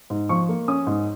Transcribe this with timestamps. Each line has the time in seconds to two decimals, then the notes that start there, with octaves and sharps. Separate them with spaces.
0.10 G#2
0.29 F3 C#6
0.49 A#3
0.68 C#4 D#6
0.87 G#2